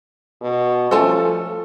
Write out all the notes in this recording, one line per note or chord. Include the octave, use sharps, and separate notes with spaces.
B2
F3 A3 C#4 A4 C5 A5